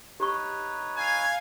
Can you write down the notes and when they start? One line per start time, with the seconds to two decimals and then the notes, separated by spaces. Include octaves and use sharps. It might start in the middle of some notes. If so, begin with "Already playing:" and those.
0.20 D#4 G4 B4 C#5 C#6
0.97 F5 G#5 G#6